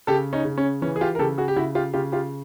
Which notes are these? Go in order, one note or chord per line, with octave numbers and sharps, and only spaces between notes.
C#3 G4 A4
C#4 D#4
C#3
C#4
E3 C#4
G#4
F4 G4
A#4
C#3 G4 A4
F#4 G#4
G4
C#3 E4 F#4
F4 G4
C#3 F4 G4
F4 G4